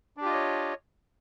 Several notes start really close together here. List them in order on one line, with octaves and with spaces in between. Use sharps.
D4 G4 F4 D#5 C#5